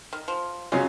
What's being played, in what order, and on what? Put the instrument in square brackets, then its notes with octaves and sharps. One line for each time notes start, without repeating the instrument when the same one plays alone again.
[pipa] D#3
F3
[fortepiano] C#3 F#3 C#4 F4 [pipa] G#3